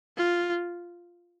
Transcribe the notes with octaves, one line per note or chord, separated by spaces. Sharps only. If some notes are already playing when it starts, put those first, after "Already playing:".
F4